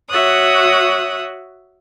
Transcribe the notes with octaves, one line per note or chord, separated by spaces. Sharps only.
F#4 C#5 E5 D#6 F#6